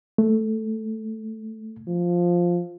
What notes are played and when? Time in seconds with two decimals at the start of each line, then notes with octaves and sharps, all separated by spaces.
0.18 A3
1.88 F3